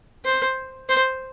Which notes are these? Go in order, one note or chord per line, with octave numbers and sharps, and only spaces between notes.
C5
C5